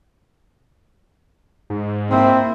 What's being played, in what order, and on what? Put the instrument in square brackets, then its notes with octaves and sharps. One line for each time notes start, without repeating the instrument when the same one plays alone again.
[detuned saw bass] G#2
[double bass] A#3 E4 [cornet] C4